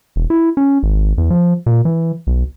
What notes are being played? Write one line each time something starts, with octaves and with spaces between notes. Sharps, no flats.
E1
E4
C#4
G#1
E2
F3
A#2
E3
B1